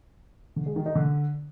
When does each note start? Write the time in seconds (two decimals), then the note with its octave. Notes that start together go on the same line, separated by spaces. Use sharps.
0.56 D3
0.66 G#3
0.76 D#3
0.86 D#4
0.95 D3